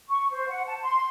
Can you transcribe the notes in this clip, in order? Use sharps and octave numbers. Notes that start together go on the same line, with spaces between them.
C#6
C5
F#5
A5
C6